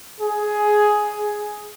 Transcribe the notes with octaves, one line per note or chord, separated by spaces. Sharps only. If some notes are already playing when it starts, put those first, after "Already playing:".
G#4